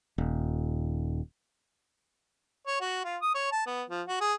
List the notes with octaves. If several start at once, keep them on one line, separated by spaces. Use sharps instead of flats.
D#1
C#5
F#4
F4
D#6
C#5
A5
B3
F3
F#4
G#4